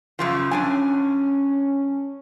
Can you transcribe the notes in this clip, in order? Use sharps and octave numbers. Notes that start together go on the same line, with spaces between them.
F#2 C#3 F3
F#2 C#4 D4 G#5